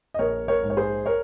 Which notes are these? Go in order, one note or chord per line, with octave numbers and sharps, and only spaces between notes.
D#5
A#1 A#4 C#5
A#4 C#5
G#2
C#5
G#4 C5
A#4 C#5